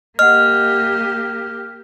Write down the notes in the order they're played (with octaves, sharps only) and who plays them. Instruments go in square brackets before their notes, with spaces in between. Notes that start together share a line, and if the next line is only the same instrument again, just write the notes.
[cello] A#3 G4 [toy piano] D#5 F#5 [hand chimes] F6